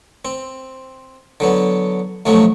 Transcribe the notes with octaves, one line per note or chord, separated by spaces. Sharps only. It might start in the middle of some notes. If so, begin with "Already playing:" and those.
C4
D3 F#3 B3
D2 C3 F3 F#3 A3